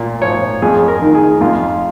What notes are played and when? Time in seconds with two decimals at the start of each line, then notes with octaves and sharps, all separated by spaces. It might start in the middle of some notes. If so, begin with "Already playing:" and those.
Already playing: A#2
0.22 F3 C#5
0.62 F2 G#4
0.88 A#4
1.02 D#3
1.15 G#4
1.40 F2 F4